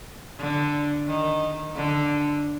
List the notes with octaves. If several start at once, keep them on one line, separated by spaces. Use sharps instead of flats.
D3
D#3
D3